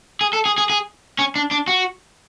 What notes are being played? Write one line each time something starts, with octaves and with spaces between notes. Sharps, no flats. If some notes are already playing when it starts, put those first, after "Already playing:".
G#4
A4
G#4
G#4
G#4
C#4
D4
D4
F#4